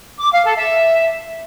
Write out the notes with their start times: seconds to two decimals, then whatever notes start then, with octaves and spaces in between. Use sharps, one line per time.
0.20 D6
0.32 F5
0.44 A4
0.56 E5